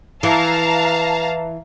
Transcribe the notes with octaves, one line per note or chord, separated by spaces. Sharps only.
E3 F5 A5 A#5